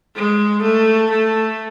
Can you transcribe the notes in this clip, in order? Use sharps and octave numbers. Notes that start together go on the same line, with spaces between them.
G#3
A3
A3